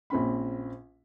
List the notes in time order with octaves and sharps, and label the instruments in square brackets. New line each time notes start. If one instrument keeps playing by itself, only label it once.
[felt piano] A#1 C4 C#4 B5